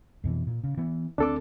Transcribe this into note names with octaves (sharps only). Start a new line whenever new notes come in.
F2 B2 E3
A#2
C#3
E3 B3
D2 C4 D4 A4 D6